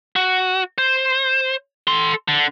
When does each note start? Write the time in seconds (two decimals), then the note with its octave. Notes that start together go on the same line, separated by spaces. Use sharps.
0.16 F#4
0.78 C5
1.87 A4 C6
2.28 D3